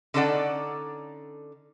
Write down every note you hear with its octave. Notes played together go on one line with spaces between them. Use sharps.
D3 C#4 D#4 A4 D5 F#5